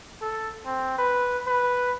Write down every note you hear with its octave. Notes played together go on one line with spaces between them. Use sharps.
A4
C4
B4
B4